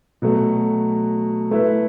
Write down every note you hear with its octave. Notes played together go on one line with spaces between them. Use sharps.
B2 F#3 A3
A3 E4 B4